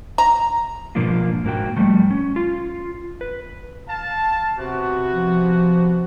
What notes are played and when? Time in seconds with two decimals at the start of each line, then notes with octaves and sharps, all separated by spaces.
0.18 A#5
0.95 G#2 B2 F3 A#3 D4 F4
1.44 G#2 A#3 F#4 G5
1.77 F3 G3 A3
2.11 C#4
2.36 F4
3.21 B4
3.87 F5 A5
4.58 C3 B3 F#4
5.13 F3